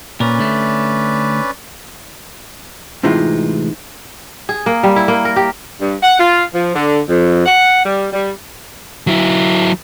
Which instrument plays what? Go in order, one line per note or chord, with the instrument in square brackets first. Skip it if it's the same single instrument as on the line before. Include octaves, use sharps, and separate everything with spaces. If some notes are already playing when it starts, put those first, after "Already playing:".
[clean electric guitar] A#2 A#4 [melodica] C#4 B4 D5
[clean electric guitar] D3 A3
[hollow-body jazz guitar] A2 C3 E3 G#3 D#4 F4
[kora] G#4
A#3
G3
E4
A#3
A#4
G4
[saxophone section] G2
F#5
F4
F3
D3
F2
F#5
G3
G3
[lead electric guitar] F#3 E4